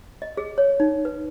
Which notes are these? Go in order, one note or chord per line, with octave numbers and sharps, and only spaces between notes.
D#5
G#4
C#5
D#4
B4